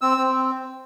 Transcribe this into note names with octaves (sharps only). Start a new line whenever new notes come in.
C4 E6
C4